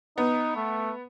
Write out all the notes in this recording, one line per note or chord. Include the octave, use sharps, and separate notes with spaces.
B3 D#4
A3